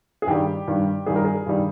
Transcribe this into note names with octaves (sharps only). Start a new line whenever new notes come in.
G#4
G2 D#3 G3 G4
G2 D#3 G3
G2 D#3 G3 G#4
A#4
G#4
G2 D#3 G3